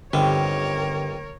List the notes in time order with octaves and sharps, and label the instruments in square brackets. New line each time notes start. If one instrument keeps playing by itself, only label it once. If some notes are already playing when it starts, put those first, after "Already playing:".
[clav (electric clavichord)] G1 [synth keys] D3 [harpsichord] D#3 C4 G4 [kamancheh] A#4 C#5